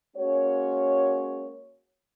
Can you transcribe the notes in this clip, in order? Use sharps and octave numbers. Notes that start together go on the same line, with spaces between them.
G#3 A#3 C#4 F#4 C#5